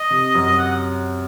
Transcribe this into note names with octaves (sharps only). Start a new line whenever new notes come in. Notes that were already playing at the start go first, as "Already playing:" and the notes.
Already playing: D#5
C3
F#2
F#5